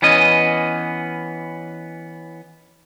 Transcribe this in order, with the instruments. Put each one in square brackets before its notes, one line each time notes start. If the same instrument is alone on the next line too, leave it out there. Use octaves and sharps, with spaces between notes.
[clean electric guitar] E3 B3 C#4 D#5